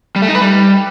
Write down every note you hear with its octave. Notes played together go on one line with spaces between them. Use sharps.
G3
A3
D#4
B4
G3